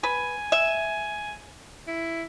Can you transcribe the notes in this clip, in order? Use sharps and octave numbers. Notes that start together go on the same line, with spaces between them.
B4 G#5
E5
E4